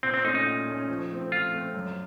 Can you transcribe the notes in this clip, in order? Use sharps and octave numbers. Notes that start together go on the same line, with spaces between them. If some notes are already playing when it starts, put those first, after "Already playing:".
A#2 C4
C4
A3 C#4 D#4
D#4
A#2
A3 C#4
F3
A3 C4
F3 F4
A3 C4
F#2